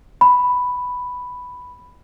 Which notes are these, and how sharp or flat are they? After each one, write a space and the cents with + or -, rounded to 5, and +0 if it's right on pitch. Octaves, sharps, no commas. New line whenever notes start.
B5 +5